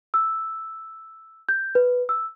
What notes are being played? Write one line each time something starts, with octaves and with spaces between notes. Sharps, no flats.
E6
G6
B4
E6